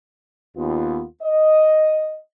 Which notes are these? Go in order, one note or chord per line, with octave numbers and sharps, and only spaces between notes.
D#2 B3 F4
D#5